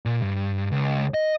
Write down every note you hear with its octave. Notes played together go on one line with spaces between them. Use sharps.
A#2
G2
C#2
D#5